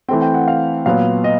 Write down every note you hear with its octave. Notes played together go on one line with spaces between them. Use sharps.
E3 A3 C4 G5
G5
F#5
F5
A#2 F#3 B3 F5
D#5